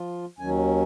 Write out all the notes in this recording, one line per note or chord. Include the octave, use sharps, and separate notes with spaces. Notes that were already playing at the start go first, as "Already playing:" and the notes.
Already playing: F3 F4
D#2 D#3 F#3 C#4 G#5